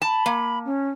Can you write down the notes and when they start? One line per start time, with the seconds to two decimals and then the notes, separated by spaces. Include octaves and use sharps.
0.02 A5 B5
0.26 A#3
0.66 C#4